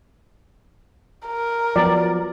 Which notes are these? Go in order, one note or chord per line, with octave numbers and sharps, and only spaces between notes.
A#4
F3 F#3 B3 D5